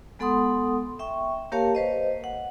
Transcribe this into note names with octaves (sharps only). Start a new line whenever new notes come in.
G#3 B3 A4 F#5 C6 D#6
E5 G5 C#6
A#3 G4 A#4 C#5 F5 A5
B4 C5 D#5
F#5